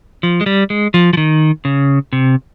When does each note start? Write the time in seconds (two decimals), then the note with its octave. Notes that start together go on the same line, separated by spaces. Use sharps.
0.23 F3
0.41 G#3
0.46 G3
0.70 G#3
0.94 F3
1.13 F3
1.17 D#3
1.65 C#3
2.13 C3